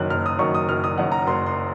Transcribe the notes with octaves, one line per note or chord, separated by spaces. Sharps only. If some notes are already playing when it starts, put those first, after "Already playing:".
Already playing: F#1 F#2 D#3 F#6
F#1 F6
D#6
F#2 D#3 C#6
D#6
F#1 F6
D#6
F#2 D#3 F#5
A#5
F#1 C6
C6